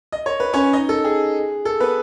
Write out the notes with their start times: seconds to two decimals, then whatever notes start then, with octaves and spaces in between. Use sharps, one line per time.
0.12 D#5
0.26 C#5
0.40 B4
0.53 C#4 C#5
0.73 D#4 D#5
0.89 A4
1.04 G#4
1.65 A4
1.80 B3 B4